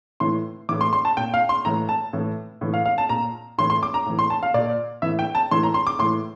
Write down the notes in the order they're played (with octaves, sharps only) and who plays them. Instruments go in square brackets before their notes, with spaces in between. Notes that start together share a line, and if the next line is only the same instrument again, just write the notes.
[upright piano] A2 E3 C6
A2 E3 D6
C6
C6
A5
A#2 G5
F5
C6
A2 E3 A#5
A5
A2 E3
A2 E3
F5
F5
A5
A#2 A#5
A2 E3 C6
C6
D6
A#5
A2 E3
C6
A5
F5
A#2 D5
A2 E3 E5
G5
A5
A2 E3 C6
A#5
C6
D6
A2 E3 C6